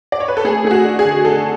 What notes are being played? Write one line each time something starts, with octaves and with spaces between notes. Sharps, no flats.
D5
C#5
B4
A4
A3 G#4
A3 G#4
F#4
D4
G#4
D3
D3 A4